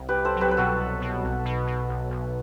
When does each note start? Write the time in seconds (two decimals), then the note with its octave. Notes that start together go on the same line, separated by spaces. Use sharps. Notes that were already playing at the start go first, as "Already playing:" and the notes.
Already playing: C2
0.09 G4 B4
0.14 C2
0.25 A4 C5
0.36 F#3
0.41 G4 B4
0.51 B4
0.57 B2 F#4 A4
0.79 C2
1.01 B2
1.23 B1
1.45 B2
1.67 B2
1.89 B1
2.10 B1